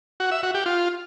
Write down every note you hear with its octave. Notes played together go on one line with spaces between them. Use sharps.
F#4
E5
F#4
G4
F4